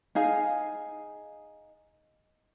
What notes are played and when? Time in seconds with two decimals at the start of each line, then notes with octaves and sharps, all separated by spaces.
0.15 D#4 G#4 F5 G#5